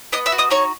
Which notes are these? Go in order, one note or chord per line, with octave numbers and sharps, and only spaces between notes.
B3 D#5 D#6
E5 E6
F#4
D#5 D#6
D#4 C#5 C#6